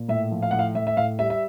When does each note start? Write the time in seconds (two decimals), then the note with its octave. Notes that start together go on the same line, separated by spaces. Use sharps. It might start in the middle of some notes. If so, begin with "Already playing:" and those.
Already playing: A#2
0.08 A2 E5
0.31 F3
0.42 F5
0.51 A2 F#5
0.59 F5
0.75 A2 E5
0.87 E5
0.97 A2 F5
1.19 G3 E5
1.30 E5